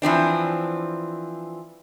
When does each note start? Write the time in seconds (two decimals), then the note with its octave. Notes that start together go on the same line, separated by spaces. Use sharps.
0.02 E3 F3 C4 D4